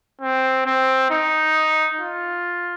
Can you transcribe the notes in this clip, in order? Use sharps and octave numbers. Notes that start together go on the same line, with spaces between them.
C4
C4
D#4
F4